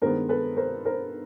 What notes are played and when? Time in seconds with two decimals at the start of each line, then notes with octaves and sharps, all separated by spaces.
0.02 G2 D#3 G#3 B3 A#4 C5
0.29 A4 B4
0.57 A#4 C5
0.86 A#4 C5